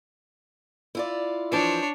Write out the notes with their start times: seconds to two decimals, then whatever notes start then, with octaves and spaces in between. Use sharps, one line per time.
0.95 E4 F4 D5
1.52 E3 F3 D4 C5 C#5